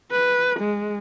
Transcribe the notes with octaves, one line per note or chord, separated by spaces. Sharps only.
B4
G#3